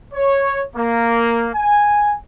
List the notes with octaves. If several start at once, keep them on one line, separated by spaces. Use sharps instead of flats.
C#5
A#3
G#5